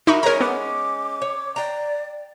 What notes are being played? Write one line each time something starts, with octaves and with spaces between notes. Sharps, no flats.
D#4 E4 F#4 A#4 B5 C#6
G#3 C#4 A#4 C#5 A#5
B3 D6
C#5
D5 G5 A#5